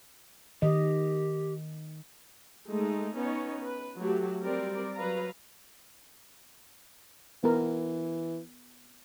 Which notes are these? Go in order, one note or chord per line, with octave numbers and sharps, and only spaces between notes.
D#3 G4 D#5
G#3 A3 D#4
B3 C#4 D#4 C#5
B4
F#3 A3 F#4 G4
G3 C4 G4 A#4 D5
F#3 B4 F5 A#5
E3 B3 A#4